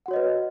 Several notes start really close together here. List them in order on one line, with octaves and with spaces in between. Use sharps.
F#5 F#4 C#5 D#5 B4